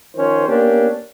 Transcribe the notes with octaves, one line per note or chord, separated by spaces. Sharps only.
D#3 F3 C#4 C5
A#3 B3 C#4 D4 G4